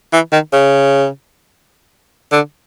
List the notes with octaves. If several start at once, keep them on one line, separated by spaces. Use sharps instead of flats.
E3
D#3
C#3
D3